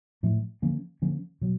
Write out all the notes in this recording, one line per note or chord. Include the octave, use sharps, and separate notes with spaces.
A2 F3 A3
D3 F3 A#3 C#4
D3 F3 A#3 C#4
B2 F#3